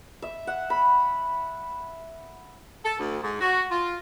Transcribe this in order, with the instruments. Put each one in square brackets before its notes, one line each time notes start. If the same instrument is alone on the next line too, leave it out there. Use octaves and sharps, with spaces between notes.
[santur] E5
F#5
B5
[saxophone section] A4
D2
G#2
F#4
F4